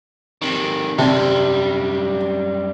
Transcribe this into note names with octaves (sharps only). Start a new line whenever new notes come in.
C3 D#3
F#2 C3 G3 A5